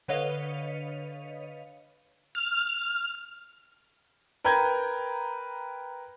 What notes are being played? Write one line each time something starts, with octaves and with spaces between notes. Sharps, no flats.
D3 B4 C#5 D#5 F5
F6
A#4 B4 G5 A#5 G6 G#6